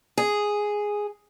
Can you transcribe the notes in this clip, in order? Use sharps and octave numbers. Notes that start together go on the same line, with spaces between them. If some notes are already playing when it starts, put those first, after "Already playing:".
G#4